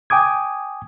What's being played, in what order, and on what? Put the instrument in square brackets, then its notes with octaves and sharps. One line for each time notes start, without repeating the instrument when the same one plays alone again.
[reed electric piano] G5 G#5 D6 D#6 G#6